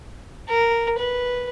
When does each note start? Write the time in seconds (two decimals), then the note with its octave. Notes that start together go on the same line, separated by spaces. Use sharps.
0.49 A#4
0.99 B4